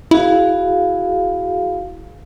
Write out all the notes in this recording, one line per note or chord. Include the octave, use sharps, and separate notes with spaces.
E4 F#4 G#4 F5